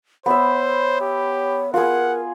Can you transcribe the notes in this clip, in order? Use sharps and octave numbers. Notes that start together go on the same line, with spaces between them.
B3 C5 C#5 E5
G4
F4 G#4 A#4 F#5